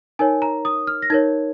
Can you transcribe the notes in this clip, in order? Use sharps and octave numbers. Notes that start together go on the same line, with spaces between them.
D#4 A#4 C#5 G#5
A#5
D#6
F6
A#6
D#4 A#4 C#5 G#6